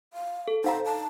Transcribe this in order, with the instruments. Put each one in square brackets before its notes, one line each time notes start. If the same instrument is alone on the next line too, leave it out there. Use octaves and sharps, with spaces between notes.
[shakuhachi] F5
[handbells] A4
[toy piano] D#4 F5 A#5 [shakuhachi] C5
[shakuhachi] A5